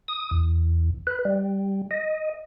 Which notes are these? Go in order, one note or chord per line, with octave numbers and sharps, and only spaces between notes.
D#6
E2
B4
G3
D#5